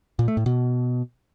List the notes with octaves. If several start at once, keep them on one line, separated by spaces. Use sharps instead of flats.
A#2
A3
A2
B2